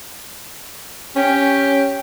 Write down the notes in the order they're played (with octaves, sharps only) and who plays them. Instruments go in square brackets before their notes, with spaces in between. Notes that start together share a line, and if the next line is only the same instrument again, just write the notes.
[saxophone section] C#4 [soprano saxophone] G4